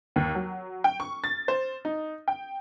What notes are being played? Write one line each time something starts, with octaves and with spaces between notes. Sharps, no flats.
D#2
F#3
G5
C#6
A6
C5
D#4
G5